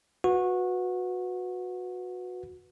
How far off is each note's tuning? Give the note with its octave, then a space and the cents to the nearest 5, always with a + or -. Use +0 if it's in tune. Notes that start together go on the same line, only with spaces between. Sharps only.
F#4 -20 B4 +0